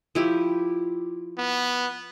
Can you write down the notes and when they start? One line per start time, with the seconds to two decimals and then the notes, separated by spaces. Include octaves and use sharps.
0.15 F3 E4 G4
1.38 B3